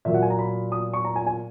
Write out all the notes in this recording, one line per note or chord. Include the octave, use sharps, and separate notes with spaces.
A#2 F#3 A#3 E5
F#5
G#5
A#5
B5
D#6
C#6
A#5
G#5
G#5